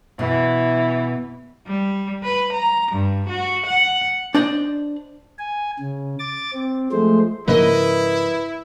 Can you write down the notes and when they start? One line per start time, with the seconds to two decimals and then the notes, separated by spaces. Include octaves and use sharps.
0.19 B2 E3
1.66 G3
2.23 B4
2.53 A#5
2.92 G2
3.29 F#4
3.66 F#5
4.35 D4 C5 D5 D#5
5.38 G#5
5.79 C#3
6.19 D6 A6
6.53 C4
6.92 F3 G#3 A3 C5
7.48 G#2 C#3 F3 A#3 E4 B4 D#5